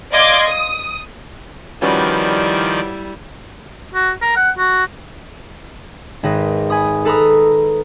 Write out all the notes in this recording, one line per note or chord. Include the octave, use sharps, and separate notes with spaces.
D5 D#5 F5 C6 D6 G#6
D#6
D#3 F3 G3 C#4 E4 F#4 B4 D5
F#4
A#4
F#5
F#4
G#1 B4 D#5
G#5 B5 D#6
A4 B4 A#5 B5 D#6